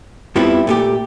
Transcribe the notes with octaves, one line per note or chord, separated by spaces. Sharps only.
F2 F3 G3 B3 C4 E4
A#2 A3 G4